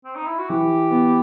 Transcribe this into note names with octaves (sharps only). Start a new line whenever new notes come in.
C4
D#4
E4
F#4
E3 G4
B3